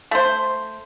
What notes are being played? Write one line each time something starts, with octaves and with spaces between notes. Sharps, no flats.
A3 C5